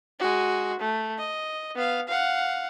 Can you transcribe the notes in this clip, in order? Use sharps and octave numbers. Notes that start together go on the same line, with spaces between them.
G#3 F#4
A3
D#5
B3 F5
F5 F#5